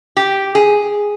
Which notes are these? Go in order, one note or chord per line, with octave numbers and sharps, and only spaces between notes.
G4
G#4